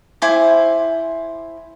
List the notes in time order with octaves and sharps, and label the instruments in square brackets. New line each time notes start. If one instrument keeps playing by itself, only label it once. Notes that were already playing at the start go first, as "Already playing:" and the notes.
[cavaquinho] E4 C5 G#5 D6